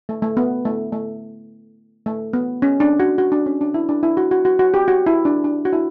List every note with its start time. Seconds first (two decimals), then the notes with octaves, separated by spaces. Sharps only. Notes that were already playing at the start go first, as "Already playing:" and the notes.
0.09 A3
0.22 A3
0.37 B3
0.65 A3
0.92 A3
2.06 A3
2.33 B3
2.62 C#4
2.80 D4
3.00 F#4
3.18 F#4
3.32 D4
3.46 C#4
3.61 D4
3.74 E4
3.89 D4
4.03 E4
4.17 F#4
4.31 F#4
4.45 F#4
4.59 F#4
4.74 G4
4.88 F#4
5.06 E4
5.25 D4
5.44 D4
5.65 F#4
5.73 E4